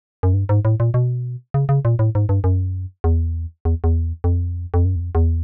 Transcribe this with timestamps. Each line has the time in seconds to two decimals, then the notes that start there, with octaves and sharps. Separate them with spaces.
0.23 F#2
0.34 G2
0.49 G#2
0.65 A2
0.80 A#2
0.94 B2
1.54 C#3
1.69 C#3
1.85 A#2
1.99 A2
2.15 G#2
2.29 G2
2.44 F#2
3.04 E2
3.65 E2
3.84 E2
4.24 F2
4.74 F2
4.85 F#2
4.96 E2
5.00 F2
5.15 E2